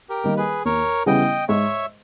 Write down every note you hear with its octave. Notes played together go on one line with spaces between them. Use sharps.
G4 A#4
D#3 G3 A#3
G#4 B4
D#2 A#4 C#5
C#3 E3 G3 B3 D#5 G5
G#2 C#5 E5